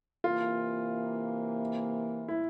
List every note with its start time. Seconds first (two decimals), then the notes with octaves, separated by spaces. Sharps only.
0.24 C3 E3 A#3 F4
2.28 E4